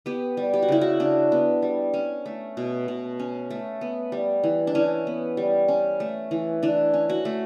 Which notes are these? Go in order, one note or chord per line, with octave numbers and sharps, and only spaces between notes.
B3 G4
G3
G4
F#4
C#3 E4
F#4
C#3 D4
B3
G3
C#4
A3
B2
B2
C#4
A3
B3
G3
E3
D4
E3 C#4
B3
G3
C#4
A3
E3
E3 D4
C#4
F#4
A3